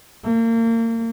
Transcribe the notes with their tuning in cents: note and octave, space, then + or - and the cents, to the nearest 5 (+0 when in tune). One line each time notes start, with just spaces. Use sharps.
A#3 -35